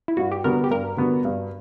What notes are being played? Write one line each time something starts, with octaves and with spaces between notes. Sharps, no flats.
E4
G2 F#4
G4
D3 G3 B3 F#4 A#4
G4
G2 A#4
D3 G3 B3 F#4
G2